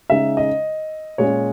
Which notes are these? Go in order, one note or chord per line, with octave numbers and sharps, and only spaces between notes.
C#3 G#3 D#4 E5
D#5
A#2 G#3 C#4 C#5